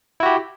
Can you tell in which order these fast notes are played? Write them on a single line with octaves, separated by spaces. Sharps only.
E4 F#4 G4